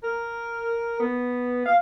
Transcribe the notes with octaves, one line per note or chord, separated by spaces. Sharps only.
A#4
B3
F5